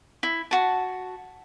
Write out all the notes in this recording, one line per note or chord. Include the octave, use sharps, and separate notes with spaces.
E4
F#4 A5